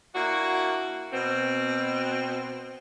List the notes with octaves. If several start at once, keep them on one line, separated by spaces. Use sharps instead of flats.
A#3 D4 E4 F#4
B2 C4